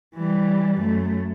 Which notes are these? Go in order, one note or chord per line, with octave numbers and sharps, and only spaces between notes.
E3 G3
F#2 A3